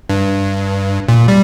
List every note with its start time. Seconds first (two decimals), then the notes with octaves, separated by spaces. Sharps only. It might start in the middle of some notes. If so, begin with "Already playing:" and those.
0.09 G2
1.08 A#2
1.28 G3